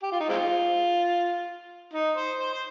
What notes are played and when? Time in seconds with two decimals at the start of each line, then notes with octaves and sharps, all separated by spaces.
0.03 G4
0.12 F4
0.20 D#4
0.29 G#3 C4 F4
1.93 D#4
2.17 C5
2.40 C5
2.53 C5